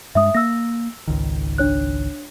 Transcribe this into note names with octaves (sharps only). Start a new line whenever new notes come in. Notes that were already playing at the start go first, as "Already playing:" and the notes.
G2 G#3 E5 D#6
A#3 E6 A#6
G#1 C#2 D#3
D4 C#5 F#6